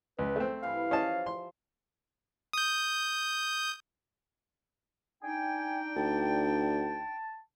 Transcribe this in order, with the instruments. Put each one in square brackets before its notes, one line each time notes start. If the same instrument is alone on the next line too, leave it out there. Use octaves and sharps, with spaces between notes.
[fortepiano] C#2 [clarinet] B4
[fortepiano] A3 C4
[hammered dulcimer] G2 E3 B4 [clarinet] F5
[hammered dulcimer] F3 C5 [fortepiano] C#4 D#5 A5
[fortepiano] C6
[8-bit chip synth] D#6 G6
[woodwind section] D4 D#4 G5 [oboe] G#5
[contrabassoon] D2 [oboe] A5